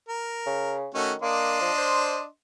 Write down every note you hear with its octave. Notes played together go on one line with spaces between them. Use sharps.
A#4
C#3
D#3 A3 C#4 F#4
A#3 D4 D#5 C6
F3
C5